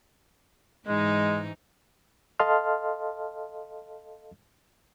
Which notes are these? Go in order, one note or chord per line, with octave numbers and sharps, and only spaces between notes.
G#2 E3 G#3 D#4
A4 D#5 F5 A5 C6 F6